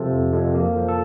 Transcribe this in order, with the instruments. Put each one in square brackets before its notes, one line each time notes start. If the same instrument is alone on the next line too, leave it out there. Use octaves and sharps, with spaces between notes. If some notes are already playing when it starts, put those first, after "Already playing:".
Already playing: [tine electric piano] C3 F3 A4
F2
F2
A#3
F3
A4